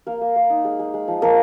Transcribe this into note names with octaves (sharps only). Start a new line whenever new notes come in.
A#3 A#4
A#3
A#3
D#4
G#3
G#3
G#3
F3
F3 A#4